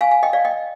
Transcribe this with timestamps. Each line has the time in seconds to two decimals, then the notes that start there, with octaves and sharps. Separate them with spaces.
0.01 F5 G#5
0.11 F5 G#5
0.23 D#5 G5
0.33 D5 F5
0.45 D#5 G5